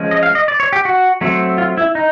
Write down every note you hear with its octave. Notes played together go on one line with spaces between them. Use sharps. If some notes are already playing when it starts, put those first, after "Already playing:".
Already playing: F3 G#3 C#4
D#5
F5
D#5
D5
C#5
G4
F#4
F#3 A3 C4
F4
E4
D#4